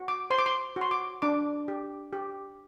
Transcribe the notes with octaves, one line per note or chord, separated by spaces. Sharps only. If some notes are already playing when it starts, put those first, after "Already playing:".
Already playing: F#4
D6
C5 C6
D6
C6
F#4
C6
D6
D4 D6
G4
G4